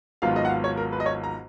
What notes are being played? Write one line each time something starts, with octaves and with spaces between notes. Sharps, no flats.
G#1 G#2 F#3 B3 F4 F5
D#5
F#5
F5
C#5
A#4
B4
D#5
C#5
A#5